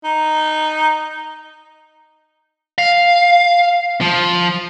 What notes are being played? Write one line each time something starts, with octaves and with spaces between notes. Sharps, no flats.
D#4
F5
F3